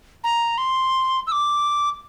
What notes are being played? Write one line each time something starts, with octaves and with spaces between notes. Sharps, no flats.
A#5
C6
E6
D6